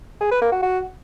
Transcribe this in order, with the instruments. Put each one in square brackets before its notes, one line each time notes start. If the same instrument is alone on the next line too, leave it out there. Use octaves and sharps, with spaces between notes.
[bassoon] G#4
B4
A#3
F#4
F#4